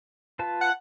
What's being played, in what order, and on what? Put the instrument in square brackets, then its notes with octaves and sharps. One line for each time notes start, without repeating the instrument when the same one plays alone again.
[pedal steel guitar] F4 B4 A5
[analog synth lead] F#5